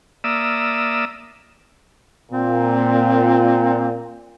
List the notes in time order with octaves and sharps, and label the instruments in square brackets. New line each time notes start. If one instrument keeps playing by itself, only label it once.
[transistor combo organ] A#3 D5 E5 D#6 E6
[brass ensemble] A#2 [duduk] C4